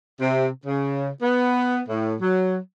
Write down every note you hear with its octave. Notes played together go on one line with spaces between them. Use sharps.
C3
C#3
B3
A2
F#3